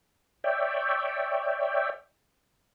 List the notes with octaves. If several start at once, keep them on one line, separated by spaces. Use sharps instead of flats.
C#5 D5 E5 G5